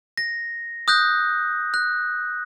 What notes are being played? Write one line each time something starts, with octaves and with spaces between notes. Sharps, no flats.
A#6
D#6 F#6 G6 A#6
F#6